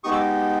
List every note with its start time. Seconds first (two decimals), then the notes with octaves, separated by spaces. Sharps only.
0.04 G#3 B3 D#4 G4 C#6 D#6
0.12 D6 E6